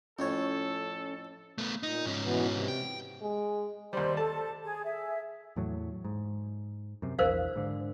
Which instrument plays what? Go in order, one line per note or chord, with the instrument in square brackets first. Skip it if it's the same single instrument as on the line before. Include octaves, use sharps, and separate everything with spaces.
[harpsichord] F2 A2 C#5 [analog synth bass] C#4 [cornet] A4
[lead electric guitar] A3 B3
[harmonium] A#2 [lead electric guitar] D#4
[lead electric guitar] G#2 C#4
[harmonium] B2 E3 B3
C3
[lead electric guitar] G5
[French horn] G#3
[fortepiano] D#2 G3 [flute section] C5 C6
[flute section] A4 [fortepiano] A5
[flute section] G#4
G#4 E5
[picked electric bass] E2 A2 F#3
G#2
F#2 C3
[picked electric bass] A#1 E2 [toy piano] A#4 C5 F5
[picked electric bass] G#2 D3